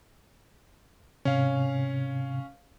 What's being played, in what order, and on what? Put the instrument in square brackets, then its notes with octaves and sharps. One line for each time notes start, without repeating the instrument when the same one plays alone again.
[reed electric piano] G#2 C3 [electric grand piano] C#4 F5